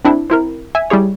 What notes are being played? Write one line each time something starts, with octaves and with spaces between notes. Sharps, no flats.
C4 D4 E4 A4
C4 E4 A#4
E5 G#5
G3 E4 G#4 C#5